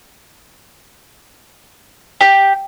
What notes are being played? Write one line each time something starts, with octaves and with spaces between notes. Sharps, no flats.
G4